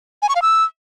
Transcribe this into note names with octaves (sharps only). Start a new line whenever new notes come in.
G#5
C#6
F5
E6